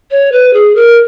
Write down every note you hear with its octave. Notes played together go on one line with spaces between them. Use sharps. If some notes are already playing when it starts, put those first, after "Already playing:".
C#5
B4
G#4
A#4